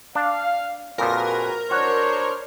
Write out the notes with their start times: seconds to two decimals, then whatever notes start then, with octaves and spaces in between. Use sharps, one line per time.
0.15 D4 F5
0.98 F2 A#2 F3 F#4 G#4 A#4 B4
1.71 D4 F#4 C5 C#5